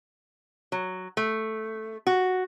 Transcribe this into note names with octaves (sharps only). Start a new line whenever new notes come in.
F#3
A3
F#4